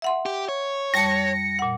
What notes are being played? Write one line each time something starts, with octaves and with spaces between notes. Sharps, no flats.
E5 F#5 C6
G4
C#5
F2 G3 A5 A#6 C#7
A#2 F#5